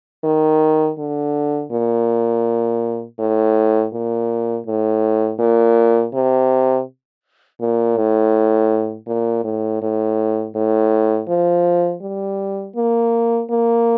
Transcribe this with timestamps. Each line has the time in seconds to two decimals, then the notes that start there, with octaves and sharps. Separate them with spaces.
0.24 D#3
0.99 D3
1.71 A#2
3.19 A2
3.93 A#2
4.67 A2
5.39 A#2
6.14 C3
7.61 A#2
7.97 A2
9.08 A#2
9.44 A2
9.82 A2
10.55 A2
11.29 F3
12.02 G3
12.76 A#3
13.50 A#3